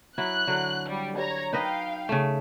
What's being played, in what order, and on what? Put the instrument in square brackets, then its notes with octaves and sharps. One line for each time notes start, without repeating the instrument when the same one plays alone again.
[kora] F#3 E4 [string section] F#6
[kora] D3 F#3
[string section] G3
C#5 A#5
[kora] D#4 B4 D#5 [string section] F5 G5
[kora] C#3 A3